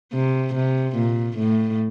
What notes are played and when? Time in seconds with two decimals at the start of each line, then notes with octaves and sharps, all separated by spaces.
0.13 C3
0.55 C3
0.96 A#2
1.37 A2